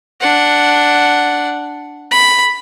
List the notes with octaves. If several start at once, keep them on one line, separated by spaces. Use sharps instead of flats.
D4 F#5
B5